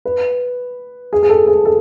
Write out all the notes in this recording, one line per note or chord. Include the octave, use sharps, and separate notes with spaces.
B4
G#4
G#4
A4
G#4
A4